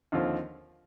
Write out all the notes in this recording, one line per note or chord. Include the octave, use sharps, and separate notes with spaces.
D#2 D3 F3 C4 F4